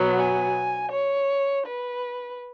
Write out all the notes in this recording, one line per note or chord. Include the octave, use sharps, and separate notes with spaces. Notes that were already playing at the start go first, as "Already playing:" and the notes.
Already playing: B2 F#3 B3
G#5
C#5
B4